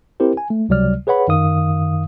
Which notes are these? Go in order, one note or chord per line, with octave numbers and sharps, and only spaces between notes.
C4 E4 G4 A#4 C5
G#5
A3
C#2 C3 F#3 G3 D5 F6
G#4 B4 C#5 F#5 B5
F#2 D#3 F5 D#6